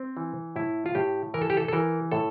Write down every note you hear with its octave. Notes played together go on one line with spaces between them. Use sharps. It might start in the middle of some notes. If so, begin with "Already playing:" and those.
Already playing: C4
E3
A2 E4
F4
A2 G4
E3 A#4
A4
G4
A4
A4
E3 A#4
A2 A4